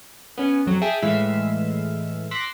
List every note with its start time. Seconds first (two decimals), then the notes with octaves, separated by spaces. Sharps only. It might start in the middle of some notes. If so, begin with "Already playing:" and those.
0.38 B3 C#4
0.66 F2 F#3
0.82 G#4 E5 G5 A5
1.02 A2 E3 G#3 E5 F5 E6
2.31 C6 D6 E6 F#6 A#6 B6